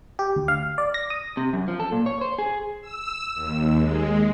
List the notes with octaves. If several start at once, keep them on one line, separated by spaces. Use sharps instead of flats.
G4
D2
F5
D5
A#6
D#6
C3
F#2
F3
A4
A#2
C#5
C5
G#4
E6
D#2
G#3